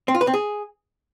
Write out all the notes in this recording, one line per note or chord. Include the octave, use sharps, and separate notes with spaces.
C4
F4
B4
C4
G#4